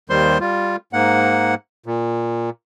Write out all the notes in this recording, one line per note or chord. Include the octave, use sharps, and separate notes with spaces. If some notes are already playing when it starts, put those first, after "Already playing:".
D#2 D#3 G3 C5 C6
G3 F4
G#2 A#3 F#5
A#2